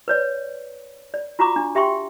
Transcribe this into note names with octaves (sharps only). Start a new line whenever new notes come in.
B4 C#5 D5
D5
F4 F#4 A#5 C#6 D6
D4
G4 E5 G5 C6 C#6